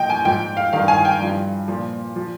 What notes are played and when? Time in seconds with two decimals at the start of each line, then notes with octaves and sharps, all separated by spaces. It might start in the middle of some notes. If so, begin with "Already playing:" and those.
Already playing: A#2 F3 D#5 G5
0.10 G#5
0.25 G#2 F3 G5
0.57 F5
0.73 G2 D#3 F5
0.88 G#5
1.05 G5
1.20 G2 F3
1.68 A#2 F3
2.16 F3